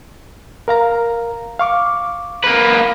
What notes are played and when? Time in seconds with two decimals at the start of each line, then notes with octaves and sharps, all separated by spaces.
0.68 A#4 F5 A#5
1.59 F5 C#6 D6
2.44 A#3 B4